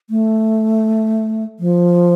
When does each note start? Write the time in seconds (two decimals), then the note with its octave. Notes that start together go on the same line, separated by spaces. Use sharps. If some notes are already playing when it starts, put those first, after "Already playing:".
0.10 A3
1.60 F3